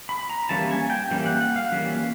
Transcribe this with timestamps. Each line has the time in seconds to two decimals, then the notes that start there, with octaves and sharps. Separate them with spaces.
0.09 B5
0.29 A#5
0.49 E3 G3 A#3 C#4 A5
0.71 G#5
0.90 G5
1.10 E3 G3 A#3 C#4 G5
1.26 F#5
1.41 F#5
1.56 F5
1.72 E3 G3 A#3 C#4